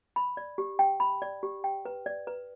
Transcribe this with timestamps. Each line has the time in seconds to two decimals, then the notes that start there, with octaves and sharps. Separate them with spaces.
0.16 B5
0.37 D5
0.58 G4
0.79 G5
1.00 B5
1.22 D5
1.43 G4
1.64 G5
1.85 B4
2.06 D5
2.27 B4